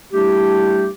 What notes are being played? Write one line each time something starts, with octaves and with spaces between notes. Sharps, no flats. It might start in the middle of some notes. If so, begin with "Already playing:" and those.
G3 A3 D4 E4 G4